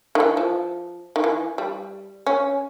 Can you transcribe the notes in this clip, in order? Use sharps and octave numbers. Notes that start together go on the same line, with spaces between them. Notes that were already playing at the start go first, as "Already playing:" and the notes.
D#3
E3
F3
D#3
E3
G3
C#4